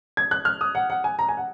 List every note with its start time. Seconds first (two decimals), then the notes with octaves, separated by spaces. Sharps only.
0.17 G#6
0.31 F#6
0.45 F6
0.61 D#6
0.75 F#5
0.90 F#5
1.04 G#5
1.19 A#5
1.29 G#5
1.37 F#5